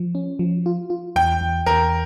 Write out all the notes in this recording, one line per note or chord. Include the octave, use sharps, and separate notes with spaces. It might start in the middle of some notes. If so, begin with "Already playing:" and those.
Already playing: F3
C#4
F3
F4
F4
E2 G5
E2
E2 A#4